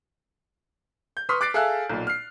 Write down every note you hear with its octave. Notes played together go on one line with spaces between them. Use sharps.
G6
B4 C6 C#6 D#6 F6 B6
D6 F#6 A6 C7 D7
G#4 A4 E5 F5 E6 F#6
B1 A#2
F6 C7